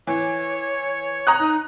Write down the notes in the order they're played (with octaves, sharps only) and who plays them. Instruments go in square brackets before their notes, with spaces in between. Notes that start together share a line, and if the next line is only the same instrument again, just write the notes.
[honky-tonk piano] E3 [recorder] C#5
[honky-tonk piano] A#5 D#6 F#6
[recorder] D#4